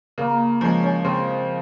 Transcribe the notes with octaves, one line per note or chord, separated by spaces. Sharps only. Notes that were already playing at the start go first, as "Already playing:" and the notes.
C#3 A#3 A#4
F3 G#3 C#4 C#5
C#4 C#5
C#3 C4 C5